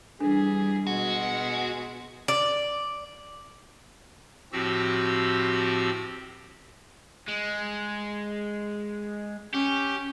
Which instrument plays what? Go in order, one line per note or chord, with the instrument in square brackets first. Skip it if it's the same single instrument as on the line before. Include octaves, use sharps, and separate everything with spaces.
[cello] E3 G3 [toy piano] D4 A4 [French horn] G#4
[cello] B2 [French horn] G#3 [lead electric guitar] F#4
[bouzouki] D5
[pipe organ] A2 F3 C4 F#4 G4 E6
[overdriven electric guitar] G#3
[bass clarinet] C#4 [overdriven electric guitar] G4